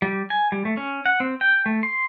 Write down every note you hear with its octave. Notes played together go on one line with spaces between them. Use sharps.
G3
G#5
G3
A3
C#4
F#5
C4
G5
A3
C6